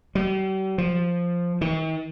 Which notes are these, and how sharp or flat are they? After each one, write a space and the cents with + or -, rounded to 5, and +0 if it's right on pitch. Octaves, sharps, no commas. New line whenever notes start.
G3 -45
F3 +0
D#3 +45